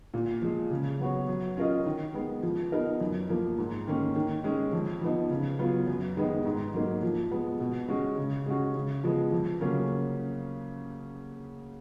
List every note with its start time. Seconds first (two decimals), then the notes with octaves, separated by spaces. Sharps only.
0.14 A#2
0.42 F3 G#3
0.71 C#3
0.99 F#3 B3 F#4 C#5
1.28 F#3
1.57 C#4 F4 A#4 D#5
1.86 D#3
2.14 G#3 B3
2.43 F3
2.72 B3 D#4 A#4
3.01 F#2
3.29 F3 A#3
3.58 G#2
3.87 D#3 A#3 C#4
4.15 D#3
4.44 G#3 C#4
4.73 F2
5.01 F3 B3 D#4
5.30 C#3
5.59 F#3 B3 F4
5.87 F#2
6.17 D#3 G#3 B3 D#4
6.45 G#2
6.74 F#3 A#3 D#4
7.02 F3
7.31 G#3 B3
7.60 B2
7.88 G#3 C#4 F#4
8.17 C#3
8.46 G#3 C#4 F#4
8.75 C#3
9.04 F3 G#3 B3
9.32 F2
9.61 C#3 F#3 A#3 C#4